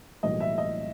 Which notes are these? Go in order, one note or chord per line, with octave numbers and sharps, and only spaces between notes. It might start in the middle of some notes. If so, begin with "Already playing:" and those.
B1 A2 E3 G3 A#3 D#5
E5
D#5